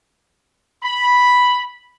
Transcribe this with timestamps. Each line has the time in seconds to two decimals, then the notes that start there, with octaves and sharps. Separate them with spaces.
0.83 B5